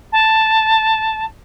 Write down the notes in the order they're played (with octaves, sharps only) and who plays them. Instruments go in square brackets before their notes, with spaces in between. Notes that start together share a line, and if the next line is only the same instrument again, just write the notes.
[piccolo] A5